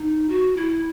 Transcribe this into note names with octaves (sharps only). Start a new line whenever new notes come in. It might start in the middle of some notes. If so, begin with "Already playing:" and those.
Already playing: D#4
F#4
E4